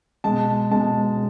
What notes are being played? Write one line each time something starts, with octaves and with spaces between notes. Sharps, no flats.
B2 G#3 A5
B2 G#3 A5